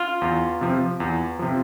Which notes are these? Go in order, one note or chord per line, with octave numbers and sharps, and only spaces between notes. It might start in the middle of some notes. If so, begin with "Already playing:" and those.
Already playing: F4
E2
C3 F3
E2
C3 F3